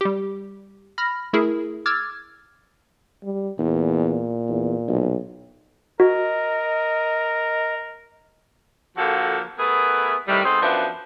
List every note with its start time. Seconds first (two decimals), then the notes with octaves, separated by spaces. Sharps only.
0.01 G3 G4
0.98 B5 F6 A#6
1.33 A3 E4 G#4 A#4
1.86 D6 E6 F6 G#6 A6
3.24 G3
3.59 E2 A#2
4.49 E2
4.88 B1
6.00 F#4 A#4 D#5
8.97 D3 F3 A#3 F#4 G#4 A4
9.57 A3 B3 E4 G#4 A#4 B4
10.27 A2 C3 D#3 G3
10.44 B3 C4 D#4 G#4 A4 C5
10.60 F#2 F3 B3 D4 C5 E5